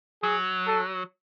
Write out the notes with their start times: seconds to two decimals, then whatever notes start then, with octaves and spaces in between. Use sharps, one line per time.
0.23 F#3 G#4
0.67 A4